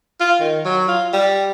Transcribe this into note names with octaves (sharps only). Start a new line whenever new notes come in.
F4
D#3
F#3
F4
G3